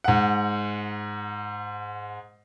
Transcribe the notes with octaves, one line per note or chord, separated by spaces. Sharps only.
G#2 F#5